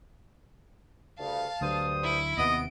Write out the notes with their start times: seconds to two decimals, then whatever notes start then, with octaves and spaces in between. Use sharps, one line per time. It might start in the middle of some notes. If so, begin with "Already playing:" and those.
1.19 D2 G2 C#3 F5 A5
1.61 D2 G2 D3 F#3 C5 D#6
2.04 E4
2.38 D#2 C3 B3 D#5 D7